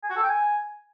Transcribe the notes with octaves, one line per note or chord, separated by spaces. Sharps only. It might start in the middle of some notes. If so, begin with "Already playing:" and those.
G#5
F#4
A4
G5
G#5